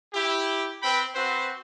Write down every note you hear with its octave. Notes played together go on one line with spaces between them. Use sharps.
E4 G4
C4 B4 G5 B5
C4 F#4 B4 C5